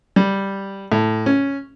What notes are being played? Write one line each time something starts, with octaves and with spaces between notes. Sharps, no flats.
G3
A2
C#4